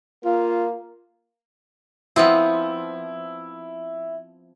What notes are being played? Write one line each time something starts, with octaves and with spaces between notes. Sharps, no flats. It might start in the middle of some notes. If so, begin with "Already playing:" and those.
A#3 F4
F3 B3 C4 E4